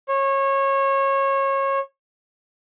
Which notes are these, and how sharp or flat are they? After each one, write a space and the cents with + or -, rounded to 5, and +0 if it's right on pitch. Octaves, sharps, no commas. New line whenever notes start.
C#5 -25